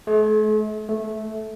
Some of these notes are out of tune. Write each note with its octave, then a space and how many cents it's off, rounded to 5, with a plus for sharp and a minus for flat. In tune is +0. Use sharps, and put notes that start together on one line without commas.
A3 -45
A3 -15